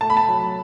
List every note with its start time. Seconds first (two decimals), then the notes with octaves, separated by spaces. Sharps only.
0.01 A3 A5
0.10 B5
0.17 A5
0.28 F#3